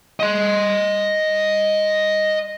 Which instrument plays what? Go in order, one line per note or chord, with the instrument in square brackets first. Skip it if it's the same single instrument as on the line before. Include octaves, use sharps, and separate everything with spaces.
[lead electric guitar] D#5 C6